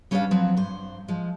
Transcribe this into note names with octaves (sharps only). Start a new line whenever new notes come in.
G3 C#4 D4 B4 D#5 F5
F3 F#3 C4 B4
G2 C5
F3 G#3